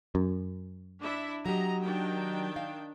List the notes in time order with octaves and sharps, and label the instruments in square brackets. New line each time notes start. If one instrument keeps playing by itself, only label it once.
[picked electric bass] F#2
[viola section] D4 E4 E5
[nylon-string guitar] F#3 G4 [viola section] D#5 A#5
[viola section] D#3 D4 G5
[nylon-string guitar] F5